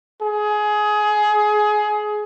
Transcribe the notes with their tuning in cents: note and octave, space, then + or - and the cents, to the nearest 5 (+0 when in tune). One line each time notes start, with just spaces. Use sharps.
G#4 +20